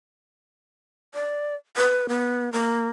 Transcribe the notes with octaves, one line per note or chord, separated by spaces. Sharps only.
D5
B4
B3
A#3